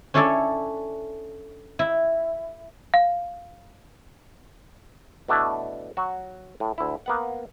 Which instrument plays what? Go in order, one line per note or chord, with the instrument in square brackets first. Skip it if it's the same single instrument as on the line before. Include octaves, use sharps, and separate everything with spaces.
[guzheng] C#4 D4 E4 A4 C#5 D5
E4
[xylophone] F5
[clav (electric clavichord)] B2 A3 D4 E4
F#3 F#4
A2
D2 E4
A#3 B3 F#5